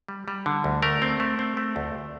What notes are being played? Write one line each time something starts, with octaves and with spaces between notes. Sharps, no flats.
G3
G3
D3
D2
A3 A#4
C4
A3
C4
A3
D2